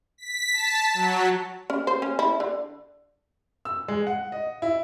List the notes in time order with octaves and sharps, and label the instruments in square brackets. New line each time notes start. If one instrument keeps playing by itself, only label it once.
[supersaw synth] B6
A5
F#3
[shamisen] C#4
C5
C#4
E4
D3
[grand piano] E6
G#3
F#5
D#5
E4